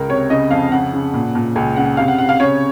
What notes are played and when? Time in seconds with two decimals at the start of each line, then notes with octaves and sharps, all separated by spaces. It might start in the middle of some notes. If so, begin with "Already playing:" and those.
Already playing: C#2 A#4
0.09 C3 C#5
0.30 C#3 D#5
0.50 F2 F5
0.72 C#3 F#5
0.94 C#3
1.14 A#2
1.35 A#2
1.56 C#2 G#5
1.76 C#3 F#5
1.97 C3 F5
2.08 F#5
2.18 C3 F#5
2.29 F5
2.40 C#3 C#5